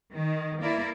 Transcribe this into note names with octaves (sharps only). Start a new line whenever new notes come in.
D#3
A#3 E4 A#4 D5